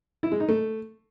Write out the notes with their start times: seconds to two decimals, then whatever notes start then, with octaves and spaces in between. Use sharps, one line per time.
0.23 E4
0.32 G#3
0.40 D#4
0.49 A3